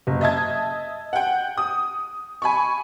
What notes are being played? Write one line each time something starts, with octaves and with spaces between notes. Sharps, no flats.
F#1
D#5 E5 A5 G#6
F#5 G5
D#6
G#5 B5 C#6